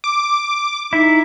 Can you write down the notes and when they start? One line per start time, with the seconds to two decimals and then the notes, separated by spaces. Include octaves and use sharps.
0.04 D6
0.93 D#4 E4